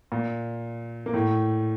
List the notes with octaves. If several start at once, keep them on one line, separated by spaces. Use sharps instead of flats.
A#2
A#3
A2 A3